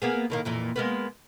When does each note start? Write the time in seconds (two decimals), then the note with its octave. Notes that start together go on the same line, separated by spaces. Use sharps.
0.02 A#3 B3 G#4
0.30 A2 D#3 A#3
0.45 F2 A#2 E3
0.76 G#3 A#3 B3